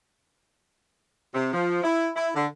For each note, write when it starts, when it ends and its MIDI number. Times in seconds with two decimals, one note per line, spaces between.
1.34 1.51 48
1.53 1.83 53
1.84 2.09 64
2.16 2.29 64
2.35 2.46 50